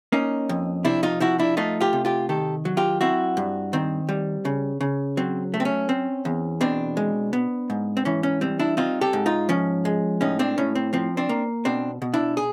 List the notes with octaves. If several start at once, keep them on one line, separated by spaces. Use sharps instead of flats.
A#3 C#4 D#4
F2
C3 D4 E4
D#4 F4
F3 E4 F#4
D4 E4
A3 D#4 F4
F4 G4
C3
F4 G4
D#3 G4 A4
F#3
F4 G4
C4 E4 F#4
G2
D#3 C4
G3
C#3
C#3
F#3 C4
A3
C4
C#4
C4
E2
B2 C4 D4
G#3
B3
G#2
C4
E3 C#4
C#4
G3 C4
D4 E4
C4 D#4 F4
G4 A4
G#2
D#4 F4
F3 C#4
G#3
A2 C#4 D#4
C4 D4
A2 C#4
C4
F3 C4
C4 D4
A#3
B2 C4 D4
B2
D4 E4
G#4